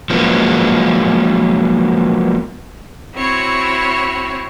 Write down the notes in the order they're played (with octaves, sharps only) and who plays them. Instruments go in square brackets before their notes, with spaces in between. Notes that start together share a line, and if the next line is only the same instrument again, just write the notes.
[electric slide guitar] F3 F#3 G#3 A#3 B3
[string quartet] C4 E4 F#4 C#5